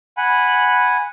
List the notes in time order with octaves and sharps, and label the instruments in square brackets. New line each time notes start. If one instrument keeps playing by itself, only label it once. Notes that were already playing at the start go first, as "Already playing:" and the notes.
[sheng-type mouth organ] F#5 G#5 B5